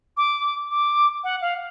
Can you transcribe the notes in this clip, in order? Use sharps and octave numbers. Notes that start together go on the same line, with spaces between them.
D6
D6
F#5
F5